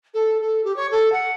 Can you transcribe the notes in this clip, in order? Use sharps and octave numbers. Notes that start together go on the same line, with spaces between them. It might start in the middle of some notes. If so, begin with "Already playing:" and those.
A4
A4
G4
C#5
A4
F#5